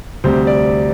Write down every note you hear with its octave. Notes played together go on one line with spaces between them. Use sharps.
D2 C3 G3 C4 C5
D5